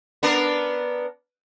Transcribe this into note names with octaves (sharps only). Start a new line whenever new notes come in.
B3 D4 A#4